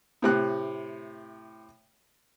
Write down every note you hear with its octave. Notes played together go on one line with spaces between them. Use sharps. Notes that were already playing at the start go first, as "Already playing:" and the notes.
A2 C3 F#6